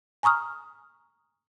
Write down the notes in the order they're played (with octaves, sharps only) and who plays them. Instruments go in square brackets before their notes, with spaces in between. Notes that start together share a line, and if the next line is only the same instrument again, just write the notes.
[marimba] G#5 A#5 C#6 D#6 F6